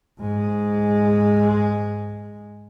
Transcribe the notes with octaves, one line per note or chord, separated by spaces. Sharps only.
G#2 G#3